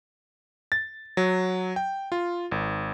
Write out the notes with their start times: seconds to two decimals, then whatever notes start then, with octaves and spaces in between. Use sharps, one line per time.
0.72 A6
1.17 F#3
1.76 G5
2.12 F4
2.52 G#1